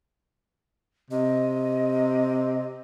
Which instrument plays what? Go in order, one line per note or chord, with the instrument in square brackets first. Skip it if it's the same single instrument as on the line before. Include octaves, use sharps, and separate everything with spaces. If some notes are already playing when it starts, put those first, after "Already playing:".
[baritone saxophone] C3 [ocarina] D#5